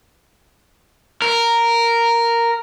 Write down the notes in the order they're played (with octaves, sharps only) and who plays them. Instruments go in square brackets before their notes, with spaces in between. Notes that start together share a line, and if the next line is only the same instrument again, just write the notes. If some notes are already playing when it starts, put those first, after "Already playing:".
[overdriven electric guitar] A#4